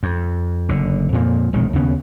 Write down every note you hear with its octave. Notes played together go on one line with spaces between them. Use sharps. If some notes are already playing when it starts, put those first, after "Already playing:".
F2
F#1 D3
F2 A#2 F3 A#3
E1 A#1 D#3 G#3
D#2 C#3 B3